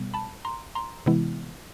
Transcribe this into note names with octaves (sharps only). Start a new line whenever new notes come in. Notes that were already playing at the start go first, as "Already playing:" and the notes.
Already playing: B2 G3 B3
A5 B5
A#5 C6
A#5 C6
C3 E3 G#3 B3 E4